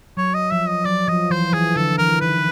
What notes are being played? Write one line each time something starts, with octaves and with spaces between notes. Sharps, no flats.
F#3 C#5
D#5
F3 E5
D#5
F#3 D5
F3 D#5
E3 C5
E3 G#4
D3 A4
E3 A#4
D#3 B4